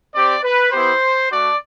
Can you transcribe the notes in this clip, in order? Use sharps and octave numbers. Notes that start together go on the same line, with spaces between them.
C4 G4 D5
B4
B3 E4 G4 C5
A3 D4 F#4 D5